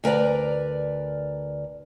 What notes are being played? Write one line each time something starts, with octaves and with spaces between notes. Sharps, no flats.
D2 A#4 B4 D5 A#5